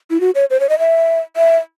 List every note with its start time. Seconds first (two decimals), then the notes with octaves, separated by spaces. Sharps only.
0.11 E4
0.20 F#4
0.35 C#5
0.50 C5
0.60 C#5
0.69 D#5
0.79 E5
1.37 E5